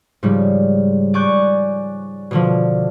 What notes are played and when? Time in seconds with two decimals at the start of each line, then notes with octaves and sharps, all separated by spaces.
0.23 G#2 C#3 F3 G3
1.14 D5 G#5 C#6 F#6 G6
2.31 B2 D3 F3